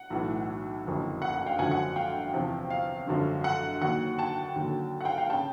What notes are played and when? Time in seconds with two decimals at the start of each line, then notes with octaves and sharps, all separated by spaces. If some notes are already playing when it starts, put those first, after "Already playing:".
Already playing: F#5
0.10 B1 A2 E3
0.85 F#1 F2 D3 F#3
1.22 F#5
1.34 F#5
1.46 F5 G5
1.59 G#1 F#2 D3 F3 F#5 G#5
1.71 F#5
1.96 F5 G5
2.33 E2 C3 F3
2.70 F5
3.08 G#1 F#2 D3 F3
3.44 F#5
3.82 D#2 D#3 F#3 F#5
4.19 G5 A5
4.56 D#2 D3 F#3
5.01 F#5
5.05 F5 G5
5.18 F5 G5
5.30 C#3 G5 A5